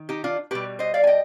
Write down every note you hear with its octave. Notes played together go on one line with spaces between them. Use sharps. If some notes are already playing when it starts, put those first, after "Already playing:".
Already playing: D#3
D#4 G4
D4 F4
B2 G3 G4 B4
C5 D#5
D5 F5
G#5
D#5 G5